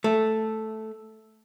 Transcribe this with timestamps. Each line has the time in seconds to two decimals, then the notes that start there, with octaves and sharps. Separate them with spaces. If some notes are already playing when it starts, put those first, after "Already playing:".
0.04 A3